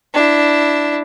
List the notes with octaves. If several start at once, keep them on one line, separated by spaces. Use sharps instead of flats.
D4 E4